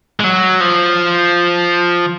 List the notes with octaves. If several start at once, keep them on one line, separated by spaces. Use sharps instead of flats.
G#3
F#3
F3